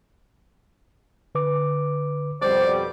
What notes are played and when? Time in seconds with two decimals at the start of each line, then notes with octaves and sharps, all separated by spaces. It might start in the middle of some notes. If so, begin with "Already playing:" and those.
1.35 D3 B4 D6
2.42 F2 B2 G3 C5 D5